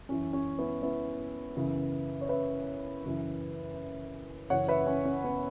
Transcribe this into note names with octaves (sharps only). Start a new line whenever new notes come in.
F#2 E3 C#4
C#4
B3 E4
B3 E4
F#2 C#3 E3
C#5
B4 E5
F#2 C#3 E3
F#2 C#3 E3 C#5 F#5
B4 E5
C#4
C#4
B3